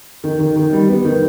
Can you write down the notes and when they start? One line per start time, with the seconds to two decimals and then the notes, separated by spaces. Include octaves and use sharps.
0.24 D#3
0.39 D#3
0.56 D#3
0.73 G3
0.89 B3
1.05 D#3